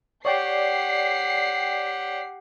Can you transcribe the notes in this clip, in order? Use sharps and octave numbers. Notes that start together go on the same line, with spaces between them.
G4 C#5 D5 F#5 G5 C7